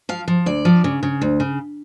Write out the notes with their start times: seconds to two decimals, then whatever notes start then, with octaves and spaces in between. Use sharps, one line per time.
0.09 F3 F5
0.28 F3
0.46 D2 D5
0.65 F3
0.84 C#3
1.03 C#3
1.21 D2
1.40 C#3